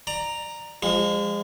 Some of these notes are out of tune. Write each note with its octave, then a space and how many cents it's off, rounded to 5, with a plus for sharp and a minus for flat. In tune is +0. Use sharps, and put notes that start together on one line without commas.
D5 +25 A#5 +0
F3 +0 G#3 -30